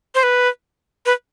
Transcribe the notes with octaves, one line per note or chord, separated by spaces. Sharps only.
C5
B4
B4